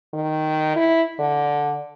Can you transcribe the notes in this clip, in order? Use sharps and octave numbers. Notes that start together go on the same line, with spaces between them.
D#3
E4
D3